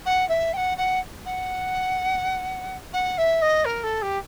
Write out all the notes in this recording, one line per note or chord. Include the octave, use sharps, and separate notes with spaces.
F#5
E5
G5
F#5
F#5
F#5
F#5
E5
D#5
A#4
A4
G4